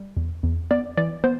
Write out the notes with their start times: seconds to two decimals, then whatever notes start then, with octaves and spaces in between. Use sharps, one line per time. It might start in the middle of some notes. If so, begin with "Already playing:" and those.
Already playing: G3
0.17 E2
0.43 E2
0.71 B3 D5
0.97 E3 D5
1.24 B3 C5